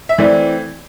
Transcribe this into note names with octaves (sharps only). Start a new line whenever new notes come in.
E5
E3 A3 C4 D5